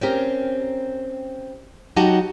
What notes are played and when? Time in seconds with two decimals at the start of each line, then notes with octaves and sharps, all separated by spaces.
0.01 C4 C#4 G4 A#4
1.96 F#3 D#4 F#4 G4 F#5 A5